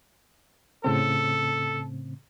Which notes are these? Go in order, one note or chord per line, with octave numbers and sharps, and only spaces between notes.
A2 C#3 C4 A4